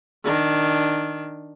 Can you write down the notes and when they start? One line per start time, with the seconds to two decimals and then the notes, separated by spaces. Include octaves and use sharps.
0.24 D#3 D4